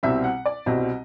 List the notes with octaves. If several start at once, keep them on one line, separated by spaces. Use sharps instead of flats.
C2 B2 G3 C4 E5
F#5
D5
C2 B2 G3 C4 D#5